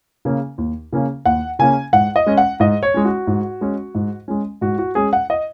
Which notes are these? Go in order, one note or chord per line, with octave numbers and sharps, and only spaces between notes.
C#3 A#3 C#4
D#2
C#3 A#3 C#4
D#2 F#5
C#3 A#3 C#4 G#5
G#2 F#5
D#5
G#3 C#4
F#5
G#2 D#5
C#5
G#3 C#4
F#4
G#2
G#3 C#4
G#2
G#3 C#4
G#2 F#4
F#4
G#3 C#4 G#4
F#5
D#5